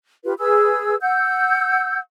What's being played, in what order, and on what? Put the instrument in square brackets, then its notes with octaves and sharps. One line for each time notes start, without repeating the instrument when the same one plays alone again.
[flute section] F4 G4 B4
G#4 B4 E6
F#5 E6 G6